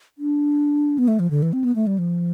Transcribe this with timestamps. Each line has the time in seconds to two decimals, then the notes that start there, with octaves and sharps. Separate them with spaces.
0.18 D4
0.98 B3
1.08 A3
1.19 F3
1.31 D3
1.42 E3
1.53 C4
1.64 B3
1.76 A3
1.87 G3
1.98 F3